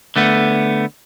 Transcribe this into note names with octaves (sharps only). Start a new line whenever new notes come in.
D3 A3 B3